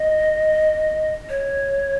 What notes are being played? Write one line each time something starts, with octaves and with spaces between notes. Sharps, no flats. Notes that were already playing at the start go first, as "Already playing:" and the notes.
Already playing: D#5
C#5